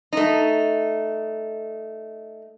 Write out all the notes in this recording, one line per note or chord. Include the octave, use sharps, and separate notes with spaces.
A3 D#4